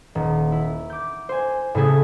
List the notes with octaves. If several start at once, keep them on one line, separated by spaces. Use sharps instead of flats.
D#1
E4
D6 G6
C5 G#5
A2 C#3 E4 G#4 A4